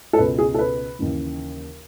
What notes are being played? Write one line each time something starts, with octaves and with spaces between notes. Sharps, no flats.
A4
C#2 B2 B4
G#4
A4
B4
D#2 C#3 E3